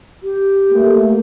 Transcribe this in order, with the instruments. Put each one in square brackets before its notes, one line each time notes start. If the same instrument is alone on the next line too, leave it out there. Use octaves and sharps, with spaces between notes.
[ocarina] G4
[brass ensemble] A3 A#3